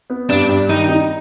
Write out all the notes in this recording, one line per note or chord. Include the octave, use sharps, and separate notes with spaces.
B3
G2 D4
G2
D#3 D#4
D#4